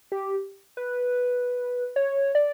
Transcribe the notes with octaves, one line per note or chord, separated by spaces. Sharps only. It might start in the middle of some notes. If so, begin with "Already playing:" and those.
G4
B4
C#5
D5